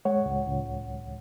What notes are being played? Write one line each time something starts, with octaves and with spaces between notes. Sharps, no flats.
G#3 C#5 F#5
C#2
C#2